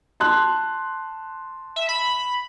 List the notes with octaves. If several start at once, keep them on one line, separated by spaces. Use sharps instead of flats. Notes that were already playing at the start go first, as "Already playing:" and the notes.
A5 C6 F#6
E5
B5